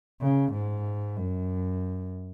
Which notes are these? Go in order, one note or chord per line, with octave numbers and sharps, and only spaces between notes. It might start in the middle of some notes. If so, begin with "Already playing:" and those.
C#3
G#2
F#2